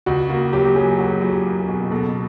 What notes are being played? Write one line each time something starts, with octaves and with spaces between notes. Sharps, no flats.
C#2 F#4
A#3 F#4
F#3 G4
G4
F#3 G#4
F#3 F#4
F#3
G4
A#3
G#4
B2
B2 A4